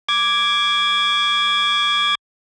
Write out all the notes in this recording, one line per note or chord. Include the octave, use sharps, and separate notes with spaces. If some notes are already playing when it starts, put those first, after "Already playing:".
D6 G#6